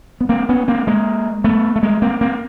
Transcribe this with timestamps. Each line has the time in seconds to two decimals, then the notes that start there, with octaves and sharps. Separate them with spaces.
0.21 B3
0.29 A#3 C4
0.49 B3 C#4
0.68 A#3 C4
0.87 G#3 A#3
1.44 A3 B3
1.76 A3
1.83 G#3 A#3
2.02 A#3 C4
2.21 A#3 C4